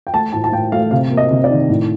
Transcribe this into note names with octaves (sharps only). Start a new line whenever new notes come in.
G5
A3 A5
A2 A5
A5
A2 G5
A3 F5
C3 F5
A#3
D#5
C3
D5
D#3
A2